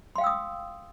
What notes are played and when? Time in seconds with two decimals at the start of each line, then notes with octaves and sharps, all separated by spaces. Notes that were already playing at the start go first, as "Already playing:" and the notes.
0.16 C6
0.18 F5
0.21 G5
0.24 E6
0.27 D#6